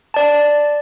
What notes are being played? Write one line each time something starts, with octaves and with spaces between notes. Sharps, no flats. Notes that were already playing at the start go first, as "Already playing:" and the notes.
D5 A5